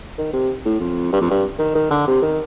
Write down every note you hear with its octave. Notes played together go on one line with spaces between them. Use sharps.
D#3
C3
A2
F2
G2
F2
G2
D#3
D#3
D3
C3
D#3